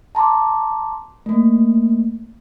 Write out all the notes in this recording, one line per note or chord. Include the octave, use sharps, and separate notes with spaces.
A5 A#5 C6 D6
A3 A#3